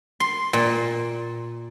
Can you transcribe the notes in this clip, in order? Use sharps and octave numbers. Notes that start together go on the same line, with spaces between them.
C6
A#2